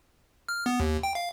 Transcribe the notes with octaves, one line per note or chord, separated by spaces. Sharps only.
F6
B3
D#2
G5
F5